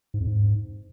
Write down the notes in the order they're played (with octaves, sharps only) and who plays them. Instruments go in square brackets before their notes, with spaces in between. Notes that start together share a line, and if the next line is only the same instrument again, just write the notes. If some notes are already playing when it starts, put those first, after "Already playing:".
[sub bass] G#2
F2
G#2